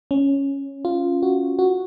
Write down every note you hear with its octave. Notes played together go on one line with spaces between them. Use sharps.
C#4
F4
F#4
F#4